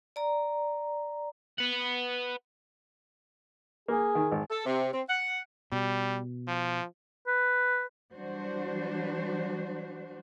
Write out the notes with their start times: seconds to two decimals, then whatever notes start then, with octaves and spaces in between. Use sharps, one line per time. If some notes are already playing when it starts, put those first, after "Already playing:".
0.16 D5 A#5
1.58 B4 F#5
3.88 A#3 G#4
4.15 D#3
4.31 G#1
4.50 A4
4.66 C3
4.92 C4
5.08 F#5
5.72 B2 G3
6.47 F3
7.27 B4
8.13 E3 F#3 G3 D4 F#4 C5